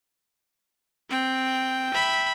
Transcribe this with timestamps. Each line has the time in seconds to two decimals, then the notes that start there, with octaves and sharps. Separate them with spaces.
1.10 C4 G5
1.94 E5 B5